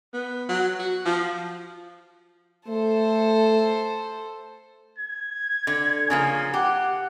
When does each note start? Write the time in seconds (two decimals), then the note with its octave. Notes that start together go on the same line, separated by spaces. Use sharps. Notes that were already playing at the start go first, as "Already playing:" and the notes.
0.13 B3
0.49 F#3
0.79 F#4
1.05 F3
2.68 A3 A4 C5
4.98 G#6
5.67 D3
6.10 C#3 F3 A#3 G#5
6.54 G4 F#5